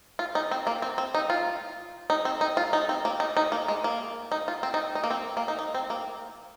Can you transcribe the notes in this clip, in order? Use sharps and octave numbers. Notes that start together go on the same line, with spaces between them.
F4
D#4
C4
A#3
C4
C4
D#4
F4
D#4
C4
D#4
F4
D#4
C4
A#3
D#4
D#4
A#3
G#3
A#3
D#4
F4
C4
D#4
D#4
A#3
C4
A#3
D#4
D#4
C4
A#3